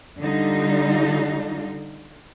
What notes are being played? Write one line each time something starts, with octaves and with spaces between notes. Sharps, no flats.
D3 G3 D#4 F4